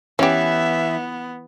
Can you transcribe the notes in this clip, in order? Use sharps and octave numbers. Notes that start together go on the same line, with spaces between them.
E3 B3 C#4 G4 E5